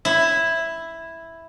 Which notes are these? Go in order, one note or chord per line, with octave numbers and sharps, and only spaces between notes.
E4